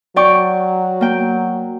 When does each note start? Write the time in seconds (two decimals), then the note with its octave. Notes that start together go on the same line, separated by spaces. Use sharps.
0.16 F#3 D5 G5 C#6
1.01 A#3 G5